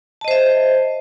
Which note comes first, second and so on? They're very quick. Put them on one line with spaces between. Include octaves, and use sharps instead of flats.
A5 D#5 C5 E5